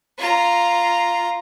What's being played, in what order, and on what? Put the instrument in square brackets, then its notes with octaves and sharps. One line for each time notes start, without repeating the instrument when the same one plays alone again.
[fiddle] F4 A#5